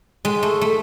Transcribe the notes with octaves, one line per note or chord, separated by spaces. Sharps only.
G#3
A3
A3